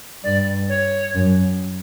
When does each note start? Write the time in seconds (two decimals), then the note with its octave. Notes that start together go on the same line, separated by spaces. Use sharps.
0.24 G2 D5
0.69 C#5
1.15 F#2